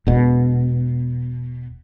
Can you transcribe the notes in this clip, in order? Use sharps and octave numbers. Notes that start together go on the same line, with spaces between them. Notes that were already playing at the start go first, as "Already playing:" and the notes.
E1 B2